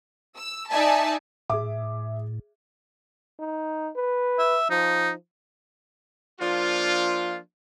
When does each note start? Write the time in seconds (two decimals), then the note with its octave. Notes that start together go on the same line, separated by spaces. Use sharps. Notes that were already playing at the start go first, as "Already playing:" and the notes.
0.36 E6
0.71 D#4 D5 E5 G#5 A5
1.50 A2 G#4 E5 D6
3.39 D#4
3.96 B4
4.39 E5
4.70 F3 D#4
6.40 F3 A#3 D4 F4